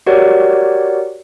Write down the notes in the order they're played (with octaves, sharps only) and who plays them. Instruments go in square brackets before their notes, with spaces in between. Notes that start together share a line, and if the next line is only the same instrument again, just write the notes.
[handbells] F#4 G4 A#4 C#5 D5 F#5